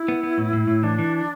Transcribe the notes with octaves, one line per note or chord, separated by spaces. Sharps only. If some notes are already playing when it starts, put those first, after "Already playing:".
Already playing: E4
B3
B3
A2
A2
A2
E3 D4
E3